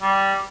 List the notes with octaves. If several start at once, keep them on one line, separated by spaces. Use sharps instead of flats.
G3